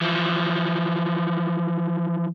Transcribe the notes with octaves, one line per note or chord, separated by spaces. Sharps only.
E3 F3